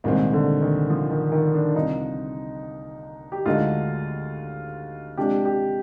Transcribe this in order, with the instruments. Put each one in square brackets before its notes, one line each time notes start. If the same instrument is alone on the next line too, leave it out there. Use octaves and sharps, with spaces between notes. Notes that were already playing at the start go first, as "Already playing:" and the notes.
[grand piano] C2 A#2 G#3 C4 [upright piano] D#3
[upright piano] D3
D#3
F3
D#3
D#3
D4
[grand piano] C2 C3 F3 [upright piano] D#4
[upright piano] G4
[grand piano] D2 D3 G#3 D#4 [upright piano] F4
[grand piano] C3 F3 G#3 D4 [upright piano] G4
[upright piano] G4